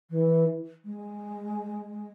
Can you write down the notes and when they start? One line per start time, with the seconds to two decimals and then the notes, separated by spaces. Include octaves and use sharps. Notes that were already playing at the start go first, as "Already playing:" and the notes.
0.10 E3
0.85 G#3